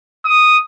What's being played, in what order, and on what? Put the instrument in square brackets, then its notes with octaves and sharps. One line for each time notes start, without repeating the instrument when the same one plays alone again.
[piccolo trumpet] D#6